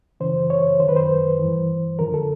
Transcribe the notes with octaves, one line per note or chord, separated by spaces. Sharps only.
F#2 C#3 E3 C5
C#5
F#2 D#3 C5
B4
C5
E3
G2
F2 D3 F3 A#4
A4